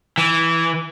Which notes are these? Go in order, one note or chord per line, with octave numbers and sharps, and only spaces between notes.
E3